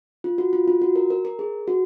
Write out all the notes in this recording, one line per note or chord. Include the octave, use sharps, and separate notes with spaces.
F4
F#4
F4
F4
F#4
A#4
A#4
A#4
G#4
F#4